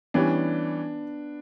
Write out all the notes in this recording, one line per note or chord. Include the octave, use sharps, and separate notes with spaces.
E3 G3 B3 C#4 D4